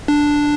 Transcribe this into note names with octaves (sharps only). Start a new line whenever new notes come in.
D4